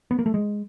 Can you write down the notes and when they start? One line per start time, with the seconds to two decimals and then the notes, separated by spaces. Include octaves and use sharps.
0.11 B3
0.19 A#3
0.26 A3
0.34 G#3